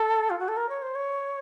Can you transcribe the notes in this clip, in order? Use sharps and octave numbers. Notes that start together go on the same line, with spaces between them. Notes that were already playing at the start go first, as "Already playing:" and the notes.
Already playing: A4
F4
F#4
A4
A#4
C#5
C5
C#5